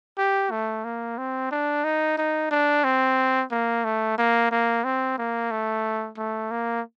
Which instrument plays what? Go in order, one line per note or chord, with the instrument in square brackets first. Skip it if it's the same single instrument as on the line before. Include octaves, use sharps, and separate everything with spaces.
[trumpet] G4
A3
A#3
C4
D4
D#4
D#4
D4
C4
A#3
A3
A#3
A#3
C4
A#3
A3
A3
A#3